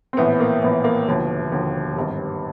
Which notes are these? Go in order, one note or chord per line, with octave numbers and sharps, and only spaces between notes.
C4
A#1 A2 E3 B3
A#3
A#1 A2 E3 B3
A#3
E1 D#2 D3 F3 B3
E1 D#2 D3 F3
G#1 G2 D#3